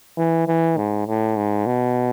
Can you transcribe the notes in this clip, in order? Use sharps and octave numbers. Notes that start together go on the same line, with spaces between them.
E3
E3
G#2
A2
G#2
B2